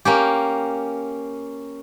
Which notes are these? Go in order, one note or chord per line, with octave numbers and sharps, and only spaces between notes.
A#3 C#4 G4